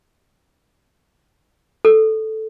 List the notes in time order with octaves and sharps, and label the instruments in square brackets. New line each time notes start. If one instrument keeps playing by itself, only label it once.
[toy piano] A4